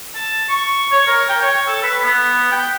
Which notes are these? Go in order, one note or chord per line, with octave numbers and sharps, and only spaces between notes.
A5
C#6
C#5
A#4
G5
C#5
A4
B4
B3
G5